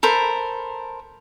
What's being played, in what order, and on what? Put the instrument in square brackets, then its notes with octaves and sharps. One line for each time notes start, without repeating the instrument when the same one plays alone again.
[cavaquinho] A4 A#4 C5 B5